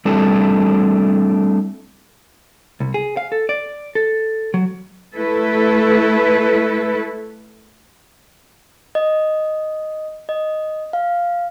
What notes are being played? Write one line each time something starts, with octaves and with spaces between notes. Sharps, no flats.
G3 A3 C4 D4 E4 A4
C2
G#4
F5
A4
D5
A4
F#3
A3 E4 A4 B4
D#5
D#5
F5